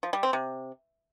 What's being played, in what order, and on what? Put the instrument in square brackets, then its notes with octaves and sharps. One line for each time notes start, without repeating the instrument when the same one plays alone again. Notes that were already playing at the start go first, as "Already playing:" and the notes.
[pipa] F3
G3
C4
C3